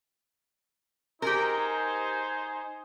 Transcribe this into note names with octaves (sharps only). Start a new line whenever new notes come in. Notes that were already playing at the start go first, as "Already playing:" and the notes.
D#4 G4 G#4 A#4 C5 G#5